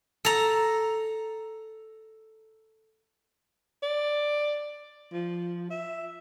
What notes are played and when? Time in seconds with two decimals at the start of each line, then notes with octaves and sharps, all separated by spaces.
0.25 A4 A#5
3.83 D5
5.13 F3
5.70 E5